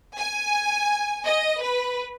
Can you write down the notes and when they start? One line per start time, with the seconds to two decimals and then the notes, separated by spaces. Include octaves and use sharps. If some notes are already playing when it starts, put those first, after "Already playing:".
0.18 G#5
1.25 D#5
1.61 B4